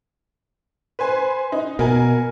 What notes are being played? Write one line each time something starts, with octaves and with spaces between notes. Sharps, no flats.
B4 C5 G#5
D#4
B2 A#4 G#5